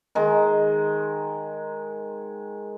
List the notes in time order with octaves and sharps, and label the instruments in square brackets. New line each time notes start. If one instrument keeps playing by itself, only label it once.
[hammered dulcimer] D#3 G#3